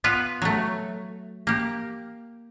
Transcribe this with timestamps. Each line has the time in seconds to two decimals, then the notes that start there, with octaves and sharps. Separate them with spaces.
0.04 B3 F4 B4
0.42 F#3 A3
1.47 A#3 G4